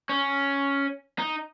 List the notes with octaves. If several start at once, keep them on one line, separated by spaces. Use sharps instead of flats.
C#4
D#4